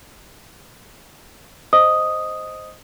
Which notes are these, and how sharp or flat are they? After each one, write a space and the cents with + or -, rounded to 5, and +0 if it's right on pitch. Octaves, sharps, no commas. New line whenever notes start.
C5 +0 D#5 +0 D#6 +0